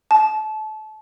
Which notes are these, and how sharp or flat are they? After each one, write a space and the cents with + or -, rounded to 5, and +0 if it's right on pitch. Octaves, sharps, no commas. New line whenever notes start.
A5 -30